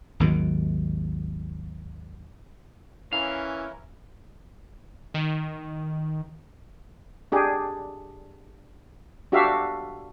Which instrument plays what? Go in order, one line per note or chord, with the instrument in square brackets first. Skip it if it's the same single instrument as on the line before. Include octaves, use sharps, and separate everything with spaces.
[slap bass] G#1 D#2 D#3 F#3
[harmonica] E3 [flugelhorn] C#4 [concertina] E4 A#4 [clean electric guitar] F5
[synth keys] D#3
[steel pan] D4 G4 G#4
D4 F#4 G4 E5 F5